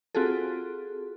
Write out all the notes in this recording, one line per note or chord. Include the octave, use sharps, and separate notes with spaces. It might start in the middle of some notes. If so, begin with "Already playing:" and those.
C4 F4 F#4 G#4 A4